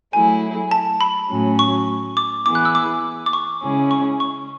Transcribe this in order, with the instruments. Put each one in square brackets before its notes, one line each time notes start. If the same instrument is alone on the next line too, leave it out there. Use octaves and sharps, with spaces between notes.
[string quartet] F#3 A3 E4 G#4 [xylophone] G#5
[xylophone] A5
B5
[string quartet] A2 F#3 C#4
[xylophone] C#6
D6
[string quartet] E3 B3 E4 G#4 [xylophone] D6
[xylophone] F#6
E6
D6
D6
C#6
[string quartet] C#3 G#3 C#4 E4 G#4
[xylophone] C#6
C#6